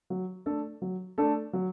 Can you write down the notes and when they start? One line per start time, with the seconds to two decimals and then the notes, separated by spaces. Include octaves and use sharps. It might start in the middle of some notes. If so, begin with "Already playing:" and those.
0.10 F#3
0.46 A3 D4 A4
0.82 F#3
1.18 A3 D4 A4
1.53 F#3